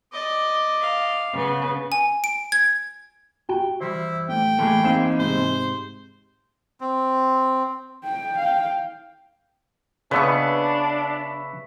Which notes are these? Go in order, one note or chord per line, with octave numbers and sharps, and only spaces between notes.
D5 D#5
F5
C#3 B3
G#5
D7
G#6
F#4 G4 G5
E3 G3 E4 C5
A2 G5
E2 E3 A3 A#3 G#4
C4 D#4 G#4 F5 C7 E7
G#2 C3 C5
C4
G5
F5 G5
C#3 B3 D4 B4 E5 C#6